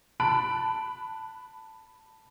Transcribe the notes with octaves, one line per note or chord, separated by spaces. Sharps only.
A5 B5 F#6 D7